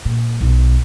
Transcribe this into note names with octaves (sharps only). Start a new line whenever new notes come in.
A#2
B1